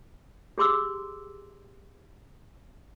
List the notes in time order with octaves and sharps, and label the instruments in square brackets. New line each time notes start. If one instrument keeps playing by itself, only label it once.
[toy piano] G4 G#4 C6 D6 E6